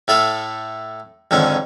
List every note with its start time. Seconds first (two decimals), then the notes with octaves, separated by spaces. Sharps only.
0.08 A2 A3 A4 F5
1.31 F2 G#2 D3 D#3 C#4